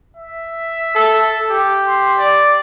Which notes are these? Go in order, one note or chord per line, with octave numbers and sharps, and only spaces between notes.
E5
A4
G4
C6
D5